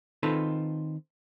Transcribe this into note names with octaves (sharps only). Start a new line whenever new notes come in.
D#3 C4 D#4 F4 A4 B4